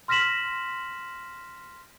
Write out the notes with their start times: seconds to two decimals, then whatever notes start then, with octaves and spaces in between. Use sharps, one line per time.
0.08 C6 F6 A#6 B6 E7 F#7